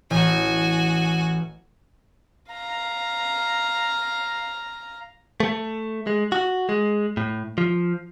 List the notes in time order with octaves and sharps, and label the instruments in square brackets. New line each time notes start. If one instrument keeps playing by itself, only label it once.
[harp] A1 [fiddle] F#4 G#5
[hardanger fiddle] F5 A#5
[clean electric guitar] A3
G#3
F#4
G#3
A2
F3